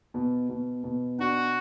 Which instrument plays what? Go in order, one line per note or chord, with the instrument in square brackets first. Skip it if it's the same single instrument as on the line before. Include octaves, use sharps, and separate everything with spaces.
[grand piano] B2
B2
B2
[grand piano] D4 [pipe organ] F#4